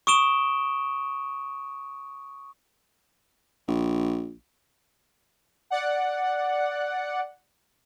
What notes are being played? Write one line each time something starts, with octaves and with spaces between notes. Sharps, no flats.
C#6 D#6 D7 E7 G7
A#1
D5 F#5